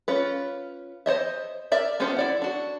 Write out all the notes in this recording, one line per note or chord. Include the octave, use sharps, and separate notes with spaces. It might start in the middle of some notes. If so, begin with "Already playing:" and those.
C#4 F4 B4
C5 C#5 D#5 E5
A#4 D5 E5
B3 C#4 D4 F4 C5
E4 D5 F#5
D4 F#4